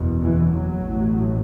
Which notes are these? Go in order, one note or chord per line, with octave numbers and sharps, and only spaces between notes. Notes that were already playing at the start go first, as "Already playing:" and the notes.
Already playing: F#1 E2 B2
E3
F#3
A1 A2